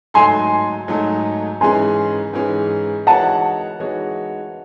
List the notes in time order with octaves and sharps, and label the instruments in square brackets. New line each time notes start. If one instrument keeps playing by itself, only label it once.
[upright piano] G#2 F#3 A3 D#4 A4 [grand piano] G#5 C6
[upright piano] G#2 F#3 A3 D#4 A4
[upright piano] G#2 E3 G#3 C#4 G#4 [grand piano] G#5 C6
[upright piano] G#2 E3 G#3 C#4 G#4
[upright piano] E3 G#3 D#4 F#4 C#5 [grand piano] F#5 A5
[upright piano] E3 G#3 D#4 F#4 C#5